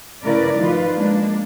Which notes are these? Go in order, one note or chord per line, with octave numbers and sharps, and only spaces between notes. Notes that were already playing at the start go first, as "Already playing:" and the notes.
C#3 A3 E4 A#4 B4 D5
D#3 F3 F4 B4
G#3 A#3 D4